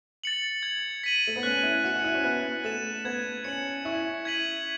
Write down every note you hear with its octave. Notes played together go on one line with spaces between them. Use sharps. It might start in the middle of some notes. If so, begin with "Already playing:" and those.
A6 C#7 F#7
G#6
B6 D#7 F#7
A3
B3
C#4 F#6
E4
F#4 C#7 E7
F#4
E4
C#4
B3 F#6
A3 A6 E7
B3 G#6
C#4 C#7 F#7
E4 C#6
G#6 B6 D#7 F#7